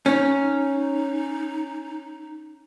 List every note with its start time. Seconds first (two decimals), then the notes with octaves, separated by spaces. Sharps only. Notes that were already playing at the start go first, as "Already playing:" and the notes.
0.06 C#4 D#4